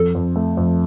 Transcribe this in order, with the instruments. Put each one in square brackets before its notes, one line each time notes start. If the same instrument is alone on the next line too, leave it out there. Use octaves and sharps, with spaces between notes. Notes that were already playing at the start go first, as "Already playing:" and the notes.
Already playing: [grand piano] F2 [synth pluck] A4
[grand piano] F2
A3
F2